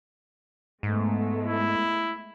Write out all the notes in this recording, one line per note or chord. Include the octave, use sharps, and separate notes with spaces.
G#2 G#3 A3 B3
E4